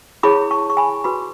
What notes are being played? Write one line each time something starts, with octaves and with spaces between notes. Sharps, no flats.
E4 G#4 C#5 B5 D6
A5 C#6
C#6
G#5 B5
F#4 B4 B5 D6